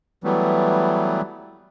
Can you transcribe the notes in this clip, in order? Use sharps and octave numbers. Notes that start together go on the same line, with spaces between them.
E3 F#3 G3 A3 B3